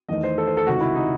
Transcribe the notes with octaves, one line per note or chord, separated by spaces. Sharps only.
E2 D#3 A3 D#5
C5
A4
C5
A4
C#2 C3 D#3 F#4
E4
D#4